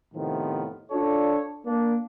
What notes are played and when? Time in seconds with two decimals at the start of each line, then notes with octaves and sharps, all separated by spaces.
0.14 A2 C3 D#3 F3 B3
0.91 D4 F4 A4 C#5 D5
1.66 A#3 D4